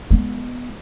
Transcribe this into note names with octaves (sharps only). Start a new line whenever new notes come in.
G#3 B3